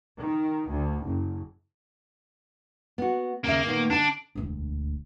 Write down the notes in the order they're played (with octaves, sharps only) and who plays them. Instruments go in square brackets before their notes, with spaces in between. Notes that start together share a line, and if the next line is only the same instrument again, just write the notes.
[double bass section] D#3
D2
F#1
[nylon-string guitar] B3 F#4
[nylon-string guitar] D#2 C#3 E5 [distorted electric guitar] A#3
[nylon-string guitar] A#2 D#3 B3
[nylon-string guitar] D3 A5 [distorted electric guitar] D4
[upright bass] E1 D2